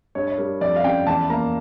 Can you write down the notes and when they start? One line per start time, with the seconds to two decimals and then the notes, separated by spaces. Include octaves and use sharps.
0.15 G2 C#5
0.27 C#5
0.38 G3 A#4
0.61 F2 D5
0.76 F5
0.84 C#3 G5
1.07 E2 A5
1.30 A#3 A#5